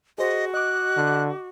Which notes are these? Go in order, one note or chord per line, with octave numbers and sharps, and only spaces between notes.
F#4 G#4 C5 D#5
D#5 D6 F#6
D3